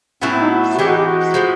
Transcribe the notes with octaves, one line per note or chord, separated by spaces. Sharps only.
A2 F#3 B3 C#4 E4
C4
D#4
F#4
F#4
E3 G#3 C4 D#4 G4
F#4
G4
F#4
A2 F3 G#3